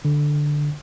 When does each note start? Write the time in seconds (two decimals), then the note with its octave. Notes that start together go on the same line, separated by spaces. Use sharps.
0.05 D3